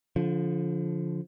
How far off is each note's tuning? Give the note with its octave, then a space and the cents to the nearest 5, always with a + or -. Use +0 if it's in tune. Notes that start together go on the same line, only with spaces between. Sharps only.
D3 -25 F3 +0